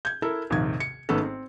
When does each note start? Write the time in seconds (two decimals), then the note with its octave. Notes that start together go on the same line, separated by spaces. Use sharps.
0.05 G6 G#6
0.22 E4 A4 A#4
0.50 A#1 D#2 G#2 C3 G#6
0.80 C#7
1.09 G#1 G#2 A3 B3 C#4 A4
1.23 C4